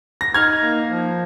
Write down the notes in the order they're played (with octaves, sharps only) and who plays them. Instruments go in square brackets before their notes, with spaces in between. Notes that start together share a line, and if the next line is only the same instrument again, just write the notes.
[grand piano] A#6
[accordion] D#4 [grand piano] F6 G#6
[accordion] A#3
F3